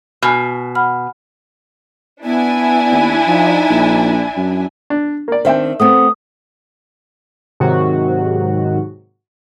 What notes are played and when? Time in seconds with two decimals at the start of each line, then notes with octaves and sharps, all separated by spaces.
0.22 B2 G#5 F6
0.75 F#5 B5 F6
2.24 B3 D4 E4 G#5
2.91 D#2
3.27 F3 D#4
3.70 A#1
4.37 F#2
4.90 D4
5.28 A#3 D5
5.45 D#3 C4 D4 C5 E5 G5
5.80 A3 B3 C4 D#6
7.60 G#2 C3 D#3 F#3 F#4